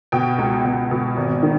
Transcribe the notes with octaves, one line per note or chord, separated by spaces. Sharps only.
B2 G5
C#2
B2
B2
G#1
D#3